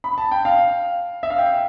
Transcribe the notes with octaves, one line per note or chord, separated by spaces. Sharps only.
B5
A5
G5
F5
E5
F5
G5